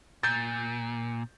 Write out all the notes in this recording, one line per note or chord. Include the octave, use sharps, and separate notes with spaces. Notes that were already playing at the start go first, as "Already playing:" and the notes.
A#2 G6 A6